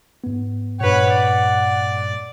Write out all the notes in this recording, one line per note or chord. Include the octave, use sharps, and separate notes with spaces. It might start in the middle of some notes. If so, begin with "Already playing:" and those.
G#2 B3
G2 A#2 B4 C#5 F#5
D5